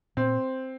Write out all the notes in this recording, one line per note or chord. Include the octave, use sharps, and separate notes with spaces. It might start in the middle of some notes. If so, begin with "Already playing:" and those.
A#2 C4